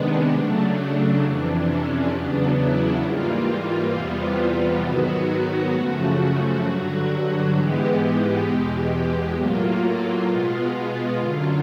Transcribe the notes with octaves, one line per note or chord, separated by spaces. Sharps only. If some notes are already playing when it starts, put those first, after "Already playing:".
Already playing: C3 D#3 G#3 B3 D4
C#3 F#3 A3
F2 C3 E3 D4
C#4
E2 C#3 F#3 B3 D4
E4
G#2 E3 G3 A#3 F4
E2 C3 E3 G3 B3
G#2 D#3 F#3 B3 F#4
F#2 C#3 F3 A3 F#4
G2 D3 F#3
G#2 E3 G#3 B3 G4
E2 B2 G#3
A2 F#3 A#3 F4
B2 G#3 B3
F#2 D3 F#3 F4